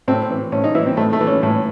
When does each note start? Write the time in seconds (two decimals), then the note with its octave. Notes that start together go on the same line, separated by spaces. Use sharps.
0.08 A2 C4
0.30 E3
0.52 A2 C#4
0.64 D#4
0.75 E3 E4
0.86 C4
0.97 A2 A3
1.13 A3
1.20 E3
1.27 C#4
1.43 A2